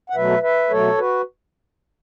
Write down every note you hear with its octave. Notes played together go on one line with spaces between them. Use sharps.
F#5
B2 F#3 A3 B4 E5
B4 E5
B2 F#3 A3 A4 C#5
F#4 B4